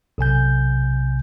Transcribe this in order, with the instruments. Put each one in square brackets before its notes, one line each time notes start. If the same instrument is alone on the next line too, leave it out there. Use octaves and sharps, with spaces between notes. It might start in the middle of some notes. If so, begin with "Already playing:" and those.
[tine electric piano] B1 C3 G#5 G6